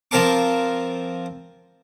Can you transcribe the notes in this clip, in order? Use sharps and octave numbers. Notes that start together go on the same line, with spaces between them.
F3 C4 A#4 A5 D6